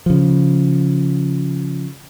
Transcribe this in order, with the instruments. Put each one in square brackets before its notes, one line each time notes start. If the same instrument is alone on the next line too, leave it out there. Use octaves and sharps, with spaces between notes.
[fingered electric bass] C#3 F3